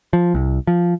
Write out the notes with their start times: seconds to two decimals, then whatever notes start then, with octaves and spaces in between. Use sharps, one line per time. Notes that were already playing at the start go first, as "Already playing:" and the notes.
0.13 F3
0.34 C2
0.67 F3